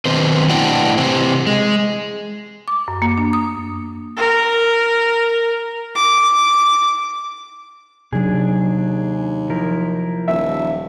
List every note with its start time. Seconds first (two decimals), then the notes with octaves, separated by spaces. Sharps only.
0.05 B2 D#3 C4 B4 C5
0.50 A2 D4 E4 F#5 G5
0.97 C3 E3 C4
1.47 G#3
2.68 D6
2.88 F#2
3.02 A#3
3.18 D4
3.33 D#6
4.17 A#4
5.95 D6
8.13 D#2 C3 F#3 D4 G#4
9.50 F3 E4 A#4
10.28 D#1 E5